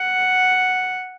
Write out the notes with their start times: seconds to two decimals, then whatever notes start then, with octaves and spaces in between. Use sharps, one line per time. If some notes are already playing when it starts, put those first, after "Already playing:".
Already playing: F#5